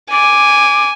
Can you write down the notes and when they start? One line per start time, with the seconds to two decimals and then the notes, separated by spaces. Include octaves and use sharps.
0.11 G#5 D6